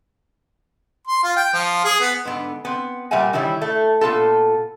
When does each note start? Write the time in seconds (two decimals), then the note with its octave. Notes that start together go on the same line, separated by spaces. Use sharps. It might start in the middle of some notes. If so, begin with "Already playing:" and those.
1.08 C6
1.24 F4
1.36 G5
1.53 F3
1.84 G#4
2.01 B3
2.25 G#2 D3 B3
2.65 B3 C4
3.11 A#2 G3 A#4 E5 F#5 G#5
3.33 D#3 E3 G3 E4 C#5
3.61 A3
4.01 A#2 B3 F4 A4